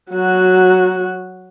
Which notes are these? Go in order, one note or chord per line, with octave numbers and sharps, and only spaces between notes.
F#3 F#4